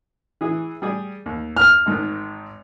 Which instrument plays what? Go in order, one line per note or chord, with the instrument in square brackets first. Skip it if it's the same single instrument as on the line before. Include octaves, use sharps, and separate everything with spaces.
[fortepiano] E3 G#4
G3 G#4 D5
D#2
[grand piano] F6
[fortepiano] G#1 G#2 D#3